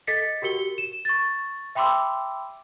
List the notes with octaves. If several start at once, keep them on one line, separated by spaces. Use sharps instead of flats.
A4 D#5 A6 B6 C#7
F#4 G4 A#4 C#7 G7
E7
C#6 A6
E5 G5 B5 C6 D6 E6